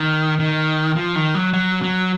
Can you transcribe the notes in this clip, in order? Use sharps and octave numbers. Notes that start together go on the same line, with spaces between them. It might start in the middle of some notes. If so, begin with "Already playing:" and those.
Already playing: D#3
D#3
F3
D#3
F#3
F#3
F#3